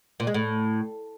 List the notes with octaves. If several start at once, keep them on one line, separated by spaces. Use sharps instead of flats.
A#2
G#3
A2